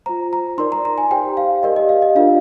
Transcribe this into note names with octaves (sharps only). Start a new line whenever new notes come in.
F4 C5 A#5
A#5
D#4 A#4 D5 C6
A#5
A#5
G#5
G4 C5 G5
F5
G4 A#4 D5 D#5
D#5
F5
D#5
D4 F4 A#4 D5 F5